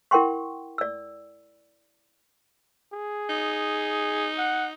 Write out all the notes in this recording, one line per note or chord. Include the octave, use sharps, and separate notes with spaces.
E4 A#4 F#5 G5 C6 C#6
D5 E6
G#4
D#4
F#5